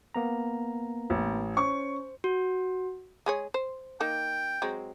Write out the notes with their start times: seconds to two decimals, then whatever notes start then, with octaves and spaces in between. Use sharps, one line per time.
0.14 A#3 B3 A#5
1.10 A1
1.57 C#4 C5 C#6
2.24 F#4
3.26 G#3 G#4 C#5
3.54 C5
4.00 A#3 D#4 G5
4.62 F#3 G#3 C4